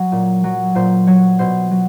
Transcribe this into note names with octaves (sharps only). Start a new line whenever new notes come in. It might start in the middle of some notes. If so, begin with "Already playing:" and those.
Already playing: F#3
A#2
F#3
A#2 C5
F#3 C#5
B2 C5
F#3